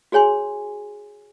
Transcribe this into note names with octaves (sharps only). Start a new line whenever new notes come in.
F#4 G#4 C#5 G#5 C6